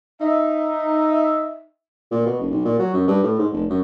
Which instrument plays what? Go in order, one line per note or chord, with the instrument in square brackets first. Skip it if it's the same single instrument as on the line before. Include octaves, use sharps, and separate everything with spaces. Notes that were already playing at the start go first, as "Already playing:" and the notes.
[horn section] D#4 E5
[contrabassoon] A#2
B2
F#1
B1
A#2
F#3
F#2
G2
A2
G#2
F1
F#2